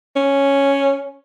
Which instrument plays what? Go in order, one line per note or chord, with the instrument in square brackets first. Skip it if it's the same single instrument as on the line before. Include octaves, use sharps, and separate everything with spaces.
[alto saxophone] C#4